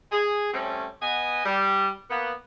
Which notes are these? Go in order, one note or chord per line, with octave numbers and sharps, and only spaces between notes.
G#4
G3 A3 C4 C#4
B3 D#5 G#5
G3
A#3 B3